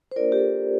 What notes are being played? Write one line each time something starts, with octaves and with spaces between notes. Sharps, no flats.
C5
A#3 D4 F4 A#4 D5
G4
A4